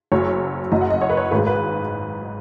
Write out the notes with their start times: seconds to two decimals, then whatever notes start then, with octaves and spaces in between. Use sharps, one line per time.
0.12 F#1 F#2 F#3 C#5
0.72 F#1 F#2 F#3 D#5
0.81 F#5
0.90 D#5
1.01 C#5
1.10 B4
1.17 C#5
1.31 G#1 G#2 G#3 B4
1.47 B4